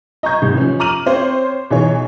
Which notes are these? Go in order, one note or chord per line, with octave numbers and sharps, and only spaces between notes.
D#5 A#5 C#6 G6 G#6
C2 G#2
F3 C#4
A#5 D6 F6 D#7 F#7
C4 C5 C#5
B1 E3 G#4 C#5